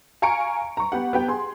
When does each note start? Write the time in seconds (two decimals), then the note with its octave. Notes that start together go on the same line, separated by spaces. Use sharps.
0.22 F5 G#5 A#5 C#6 C#7 D7
0.77 A#5 C#6
0.92 B3 G4 F#5
1.13 B3 G4 G5
1.28 G#4 C6